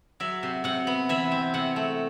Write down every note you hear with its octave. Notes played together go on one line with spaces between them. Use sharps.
F#3 E5
C3
C3 F#5
B3
E3 E5
C4
C3 F#5
A3